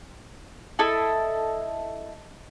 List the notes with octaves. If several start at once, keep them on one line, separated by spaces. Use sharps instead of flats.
E4 A4 D#5